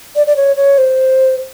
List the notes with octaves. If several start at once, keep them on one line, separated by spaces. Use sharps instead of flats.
D5
D5
C#5
C#5
C5